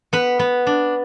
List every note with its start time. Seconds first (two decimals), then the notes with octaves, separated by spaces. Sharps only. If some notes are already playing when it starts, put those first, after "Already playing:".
0.13 B3 B4
0.39 B3
0.67 D4